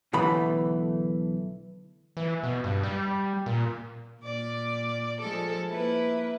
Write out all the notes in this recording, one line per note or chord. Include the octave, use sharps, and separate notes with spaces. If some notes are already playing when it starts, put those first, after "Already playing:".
B1 D3 E3 A3 B5
E3
B2
G2
G3
A#2
A#2 D5
F3 G#3 A4
A#3 E4 B4